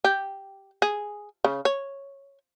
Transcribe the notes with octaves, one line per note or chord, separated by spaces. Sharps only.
G4
G#4
C#3
C#5